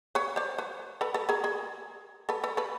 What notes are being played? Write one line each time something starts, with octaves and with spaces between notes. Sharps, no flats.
B4 C#5
C5 D5
B4 C#5
A4 B4
A4 B4
G#4 A#4
G#4 A#4
A4 B4
A4 B4
A4 B4